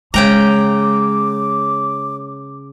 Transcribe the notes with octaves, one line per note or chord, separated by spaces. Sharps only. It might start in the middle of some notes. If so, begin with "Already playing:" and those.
C#3 G#3 G5 A#5 D6